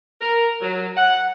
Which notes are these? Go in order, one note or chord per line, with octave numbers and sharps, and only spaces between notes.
A#4
F#3
F#5